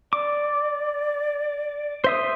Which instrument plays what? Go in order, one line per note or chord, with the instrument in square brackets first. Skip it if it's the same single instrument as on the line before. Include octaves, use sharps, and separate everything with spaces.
[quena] D5 [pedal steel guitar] D6
[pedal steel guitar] C5 E5 D#6